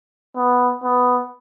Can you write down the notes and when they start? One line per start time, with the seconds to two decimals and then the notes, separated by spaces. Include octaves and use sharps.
0.36 B3
0.83 B3